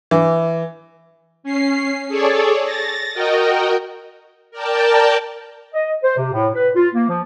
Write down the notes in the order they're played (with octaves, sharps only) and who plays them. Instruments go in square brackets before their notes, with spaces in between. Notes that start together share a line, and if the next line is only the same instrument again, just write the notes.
[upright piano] E3
[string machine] C#4 C7
G#4 A4 C#5 D5
A6 A#6
F#4 A#4 D#5 G5
A#4 D5 G5 A5
[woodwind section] D#5
C5
C3
A2
B4
F4
A#3
F3